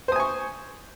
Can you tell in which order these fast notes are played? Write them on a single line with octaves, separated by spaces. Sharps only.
C5 D#6 G#5 C#6